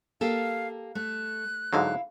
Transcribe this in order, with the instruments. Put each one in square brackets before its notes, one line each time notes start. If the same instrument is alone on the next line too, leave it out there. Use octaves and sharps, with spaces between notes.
[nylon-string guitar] A#3 G4 A4 [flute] F5
[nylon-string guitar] A3 [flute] F#6
[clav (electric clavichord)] G#2 D3 F#3 [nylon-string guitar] E4 F5